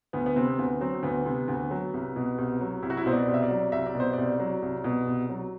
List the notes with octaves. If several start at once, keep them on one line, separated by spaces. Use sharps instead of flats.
D2 B3
B3
C3 C4
D2 B3
F#3 C4
D2 B3
C3
D2
F#3
C2
B2
C2
F#3
C2 E4
F#4
E4
B2 C5
D5
C2
E5
D5
F#3
C2 E5
D5
B2
C5
C2 D5
F#3
C2
B2
C2
F#3